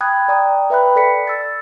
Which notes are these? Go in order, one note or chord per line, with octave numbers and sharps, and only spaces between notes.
G5 B5 D#6 F#6 G#6
D5 G5 A#5 D#6
B4 E5 G5 B5 F#6
A4 D5 B6 C#7
E6 A6